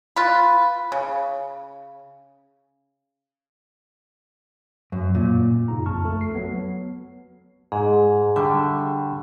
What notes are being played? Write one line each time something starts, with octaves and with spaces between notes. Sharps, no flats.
F4 B4
C#3
F#2
A#2
F#2 C#3 D#4 F4 A#5
A#1 F2 A5 C#6 F6
A3 A4
C7
F#3 B3
G#2 G#4
D3 G3 E5 G5 B5 C#6